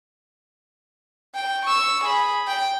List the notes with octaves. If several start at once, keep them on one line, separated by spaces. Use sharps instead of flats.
G5
C#6 E6
G#4 B5
G5